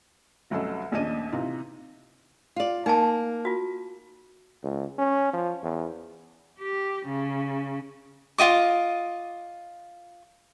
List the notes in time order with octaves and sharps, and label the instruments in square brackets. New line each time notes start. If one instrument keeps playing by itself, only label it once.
[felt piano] F1 C2 F#3 C#4 A4 D#5
A#1 D#2 C#4 D4 D#5 D#7
C3 E3 D#4 F4
[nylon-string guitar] F4 D5
[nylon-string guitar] A#3 [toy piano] D#4 G#5 A5
[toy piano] F4 F#4
[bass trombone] C#2
C#4
F3
E2
[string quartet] G4
C#3
[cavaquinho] F4 F#4 D#5 D6